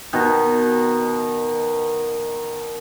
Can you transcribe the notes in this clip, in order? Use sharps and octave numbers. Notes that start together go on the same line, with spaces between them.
B2 D#3